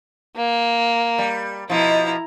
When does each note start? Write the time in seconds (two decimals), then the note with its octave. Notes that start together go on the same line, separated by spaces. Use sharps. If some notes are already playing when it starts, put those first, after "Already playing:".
0.36 A#3
1.18 G3
1.70 B2 F3 E4 A#5